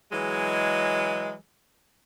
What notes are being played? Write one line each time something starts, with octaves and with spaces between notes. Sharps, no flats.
E3 F#3 G#3